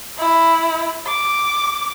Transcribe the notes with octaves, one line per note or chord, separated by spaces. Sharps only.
E4
D6